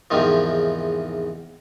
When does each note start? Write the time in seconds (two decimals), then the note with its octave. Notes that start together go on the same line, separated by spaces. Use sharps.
0.11 E2 G#2 C3 D#3 F3